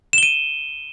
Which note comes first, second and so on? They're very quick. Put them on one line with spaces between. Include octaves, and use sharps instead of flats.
E7 G7 D#7